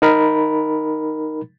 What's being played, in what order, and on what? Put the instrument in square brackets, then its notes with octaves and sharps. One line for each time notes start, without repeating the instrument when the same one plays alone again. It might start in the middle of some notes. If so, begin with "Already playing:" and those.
[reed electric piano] D#4 A#4 B5